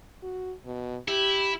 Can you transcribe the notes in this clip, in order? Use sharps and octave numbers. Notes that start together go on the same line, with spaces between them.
F#4
B2
E4 G4